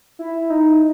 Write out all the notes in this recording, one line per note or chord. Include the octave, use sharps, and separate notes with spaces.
E4
D#4